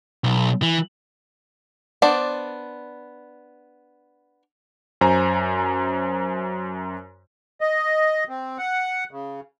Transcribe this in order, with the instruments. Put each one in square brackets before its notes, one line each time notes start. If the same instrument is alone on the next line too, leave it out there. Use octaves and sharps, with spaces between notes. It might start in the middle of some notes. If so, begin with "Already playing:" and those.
[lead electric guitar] B1
E3
[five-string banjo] B3 D4 C5 D5
[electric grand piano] F#2 C5 G#5 A#5
[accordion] D#5
C4
F#5
C#3